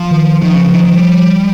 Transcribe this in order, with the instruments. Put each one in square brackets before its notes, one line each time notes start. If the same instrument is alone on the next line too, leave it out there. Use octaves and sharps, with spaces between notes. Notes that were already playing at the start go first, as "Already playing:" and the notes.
Already playing: [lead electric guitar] F3
[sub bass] D#3
[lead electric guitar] D#3 [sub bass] F3
[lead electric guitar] C#3
C#3
D#3
D#3
G3